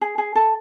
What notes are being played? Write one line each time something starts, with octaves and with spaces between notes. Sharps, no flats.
G#4
G#4
A4